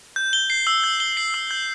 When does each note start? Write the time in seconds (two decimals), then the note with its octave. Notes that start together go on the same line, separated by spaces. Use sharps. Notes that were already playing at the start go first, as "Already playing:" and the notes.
0.16 G6
0.33 G7
0.50 C7
0.67 E6
0.84 G6
1.00 G7
1.17 C7
1.34 E6
1.51 G6